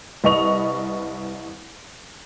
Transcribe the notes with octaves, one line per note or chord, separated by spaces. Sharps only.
C2 B4 D#5 C#6 F7